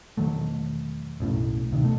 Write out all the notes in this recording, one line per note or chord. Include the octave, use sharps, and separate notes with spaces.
E1 D#3 F#3 A3
B1 F#2 A2
D1 C3 D#3
B2 A3